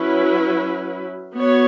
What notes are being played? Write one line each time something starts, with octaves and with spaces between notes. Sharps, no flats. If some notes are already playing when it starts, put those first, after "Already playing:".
Already playing: F#3 C#4 E4 B4
B3 F#4 C#5